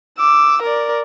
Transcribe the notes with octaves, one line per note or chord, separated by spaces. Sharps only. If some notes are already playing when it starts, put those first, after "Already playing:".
D6 E6
A#4 D5